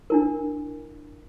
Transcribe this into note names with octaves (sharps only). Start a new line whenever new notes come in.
D4 E4 A#4